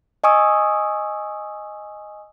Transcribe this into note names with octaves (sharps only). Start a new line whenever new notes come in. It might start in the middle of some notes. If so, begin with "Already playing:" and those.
D#5 G#5 C#6 D#6 E6